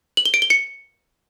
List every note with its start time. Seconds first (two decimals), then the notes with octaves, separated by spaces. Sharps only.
0.17 F#7
0.25 G7
0.34 D7
0.42 G7
0.50 C#7